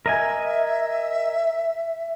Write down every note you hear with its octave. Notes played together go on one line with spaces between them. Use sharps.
A#4 D#5 E5 G#5